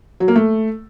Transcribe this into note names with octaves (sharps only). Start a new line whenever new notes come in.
F#3
A#3
A3